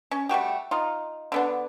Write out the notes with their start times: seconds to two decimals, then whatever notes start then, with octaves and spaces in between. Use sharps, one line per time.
0.11 C#4
0.29 G3 A3 F#4 G4
0.71 D#4 F4
1.32 D3 B3 D4